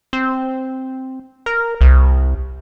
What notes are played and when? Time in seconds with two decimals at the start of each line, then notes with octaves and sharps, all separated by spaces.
0.13 C4
1.46 A#4
1.81 C2